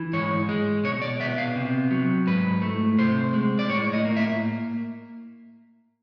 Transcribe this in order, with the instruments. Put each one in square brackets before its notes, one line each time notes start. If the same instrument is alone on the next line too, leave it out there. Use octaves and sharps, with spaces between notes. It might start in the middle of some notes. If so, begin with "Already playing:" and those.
Already playing: [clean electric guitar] E3
G#2 C#5
G#3
B2 C#5
D5
B3 E5
F5
C3
F#3
G#2 B4
A3
C3 C5
G#3
D5
A2 C#5
D#5
A#3
E5